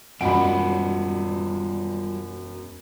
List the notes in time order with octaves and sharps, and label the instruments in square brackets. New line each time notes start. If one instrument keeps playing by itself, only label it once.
[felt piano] E1 F#2 D7 [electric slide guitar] G3 F4 D#5 [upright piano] F#5 B5